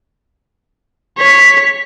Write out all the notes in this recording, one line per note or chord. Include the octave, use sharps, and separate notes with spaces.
C#5 B6